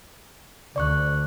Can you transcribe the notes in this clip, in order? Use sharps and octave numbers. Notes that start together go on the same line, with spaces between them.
D2 D5 C#6 F#6